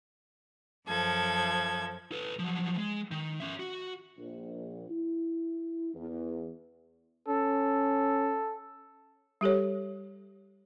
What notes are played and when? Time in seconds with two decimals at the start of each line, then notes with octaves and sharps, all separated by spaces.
0.87 F#2 F3 A4 G#6
2.12 A4 B4
2.39 F3 F#3
2.78 G#3
3.11 D#3
3.40 C#4 E5
3.60 F#4
4.17 A#1
4.89 E4
5.94 E2
7.28 C#4 A4
9.41 G3 G4 A4 C#5